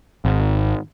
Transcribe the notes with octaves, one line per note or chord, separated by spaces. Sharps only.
G#1